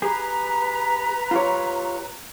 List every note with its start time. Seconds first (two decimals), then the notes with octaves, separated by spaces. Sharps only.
0.02 G4 G#4 B4 A#5
1.31 F4 G4 C#5